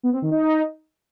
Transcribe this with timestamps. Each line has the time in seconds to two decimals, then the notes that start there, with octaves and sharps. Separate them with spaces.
0.03 B3
0.13 C4
0.22 D#3
0.31 D#4